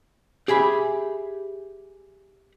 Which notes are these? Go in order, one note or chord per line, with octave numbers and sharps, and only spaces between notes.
G4 G#4 E5 B5